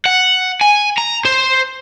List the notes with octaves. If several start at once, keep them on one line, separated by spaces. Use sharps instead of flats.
F#5
G#5
A#5
C5